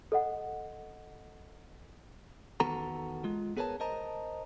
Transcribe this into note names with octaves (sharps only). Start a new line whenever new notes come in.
A4 D#5 F#5
E2 D#3 B3 F#4 A4 A#5
G#3 F4
B3 G#4 A#4 B4 C#5 A5
A#4 C5 D#5 A5 A#5